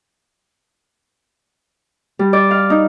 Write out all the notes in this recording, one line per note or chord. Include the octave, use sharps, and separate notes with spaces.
G3
D5
F5
D#4